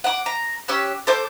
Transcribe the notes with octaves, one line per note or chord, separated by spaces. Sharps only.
F#5 D6
A#5
C#4 G4 E6 F#6
A4 C5 D6 G6